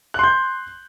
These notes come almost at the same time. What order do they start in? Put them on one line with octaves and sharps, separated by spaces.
F#6 C6 G6